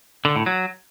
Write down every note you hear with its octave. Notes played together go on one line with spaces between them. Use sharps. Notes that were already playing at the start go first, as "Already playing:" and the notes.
D3
A2
F#3